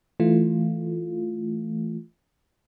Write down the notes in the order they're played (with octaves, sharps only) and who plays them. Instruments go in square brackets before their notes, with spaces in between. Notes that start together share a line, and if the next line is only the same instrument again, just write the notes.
[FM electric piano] E3 A3 F4